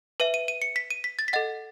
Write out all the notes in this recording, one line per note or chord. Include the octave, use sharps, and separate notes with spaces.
B4 E5 D#7
D#7
D#7
C#7
B6
D#7
B6
A6
B6
A4 D#5 F#5 A6